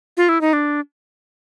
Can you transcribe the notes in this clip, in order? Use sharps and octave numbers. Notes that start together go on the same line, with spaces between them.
F4
E4
D#4
D4